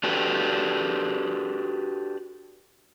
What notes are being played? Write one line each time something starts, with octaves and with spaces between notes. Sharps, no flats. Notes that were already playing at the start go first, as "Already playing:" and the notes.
D4 F#4 G4 A4 B4